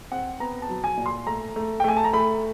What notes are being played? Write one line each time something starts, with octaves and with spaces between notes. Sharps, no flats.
C4 F#5
B3 A#5
A5
F#3
G#5
A#2
C6
A3 A#5
A3
G5
A3 G#5
A5
A#5
A3 B5